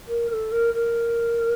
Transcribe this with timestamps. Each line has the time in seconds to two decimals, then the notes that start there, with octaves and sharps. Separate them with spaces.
0.07 A#4
0.29 A#4
0.32 A4
0.51 A#4
0.73 A#4